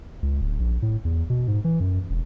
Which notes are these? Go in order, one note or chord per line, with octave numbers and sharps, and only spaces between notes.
C#2
D1
A#1
A2
E2
B2
G#2
E3
F#2
E1